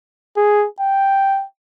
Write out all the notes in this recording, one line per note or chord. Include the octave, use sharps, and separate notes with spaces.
G#4
G5